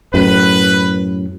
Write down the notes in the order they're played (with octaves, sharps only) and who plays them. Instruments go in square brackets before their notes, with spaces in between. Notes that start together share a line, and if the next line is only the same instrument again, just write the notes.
[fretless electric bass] F#2 A2 [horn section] B4